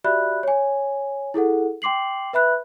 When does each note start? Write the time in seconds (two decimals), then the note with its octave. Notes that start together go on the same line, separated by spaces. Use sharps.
0.04 F#4 G4 D5 E5 B5 F#6
0.43 C#5 G#5
1.34 E4 G#4 A4 F#5
1.82 G5 C6 D6 C7 F#7
2.33 B4 E5 B5 F#6